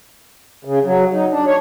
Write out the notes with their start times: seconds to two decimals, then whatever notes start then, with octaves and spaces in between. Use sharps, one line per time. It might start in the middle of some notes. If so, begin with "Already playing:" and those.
0.65 C#3
0.85 F#3
1.13 D#4
1.31 D4
1.46 C#5